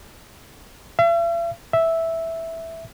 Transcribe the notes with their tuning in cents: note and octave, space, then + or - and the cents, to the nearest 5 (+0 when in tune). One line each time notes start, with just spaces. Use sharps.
E5 +45
E5 -5